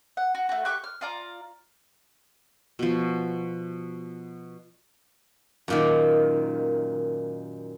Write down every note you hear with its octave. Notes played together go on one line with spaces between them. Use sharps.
F#5
F#4
A3 F#4
G4 C#6 F#6
F6
F4 D5 A#5
B2 F3
F#2 A#2 D#3